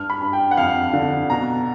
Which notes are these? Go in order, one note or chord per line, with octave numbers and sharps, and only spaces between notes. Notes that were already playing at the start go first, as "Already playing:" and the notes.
Already playing: G2 F6
B5
G2
G5
F#5
F2 F5
D3
B2 A#5